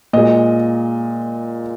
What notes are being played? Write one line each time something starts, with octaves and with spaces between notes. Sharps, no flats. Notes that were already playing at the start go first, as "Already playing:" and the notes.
A#2 G#3 D#5